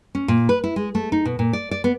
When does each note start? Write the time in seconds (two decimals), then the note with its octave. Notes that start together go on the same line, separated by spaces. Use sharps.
0.15 C#4
0.28 A#2
0.49 B4
0.64 E4
0.76 G#3
0.95 A3
1.12 D#4
1.25 B2
1.39 A#2
1.53 D5
1.71 D5
1.84 B3